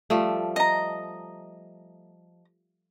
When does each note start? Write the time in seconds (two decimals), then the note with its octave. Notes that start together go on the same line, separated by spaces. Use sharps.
0.10 F3 G3 A3
0.56 D#5 A#5